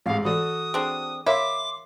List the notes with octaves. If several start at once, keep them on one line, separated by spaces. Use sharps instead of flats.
A1 G#2 F5
E3 F#4 A4 D5 D#6
C4 D4 G#4
A#4 C#5 E5 F5 B5 C6 D6